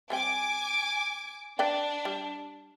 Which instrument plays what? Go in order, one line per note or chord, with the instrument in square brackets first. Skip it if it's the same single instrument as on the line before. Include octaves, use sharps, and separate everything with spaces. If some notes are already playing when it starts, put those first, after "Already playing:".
[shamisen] G3 C4 G5 [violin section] G#5 D6
[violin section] D4 [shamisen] B4 D5 G5
[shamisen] G3